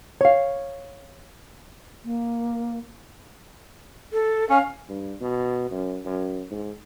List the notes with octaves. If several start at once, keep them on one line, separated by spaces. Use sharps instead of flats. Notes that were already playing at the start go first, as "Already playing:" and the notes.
C#5 F5
A#3
A4
C#4 F5
G2
B2
F#2
F#2
G#2